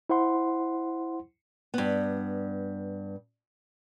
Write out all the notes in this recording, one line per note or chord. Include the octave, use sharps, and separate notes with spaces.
E4 C5 F#5 C6
G2 B3